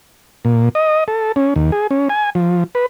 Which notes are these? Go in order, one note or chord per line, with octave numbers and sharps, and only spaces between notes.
A#2
D#5
A4
C#4
D#2
G#4
C#4
G#5
F3
B4